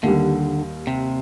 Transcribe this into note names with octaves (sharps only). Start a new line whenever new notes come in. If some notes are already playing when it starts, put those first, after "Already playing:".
D#2 D3 D#3 G3
C3